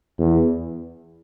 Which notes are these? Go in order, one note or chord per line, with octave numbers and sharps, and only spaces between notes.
E2